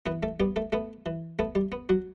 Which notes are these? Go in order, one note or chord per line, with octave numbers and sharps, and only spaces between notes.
E3 B3 B4
A3 A4
G3 B3 G4
A3 A4
A3 B3 A4
E3
A3 B3 A4
G3 G4
B3
F#3 F#4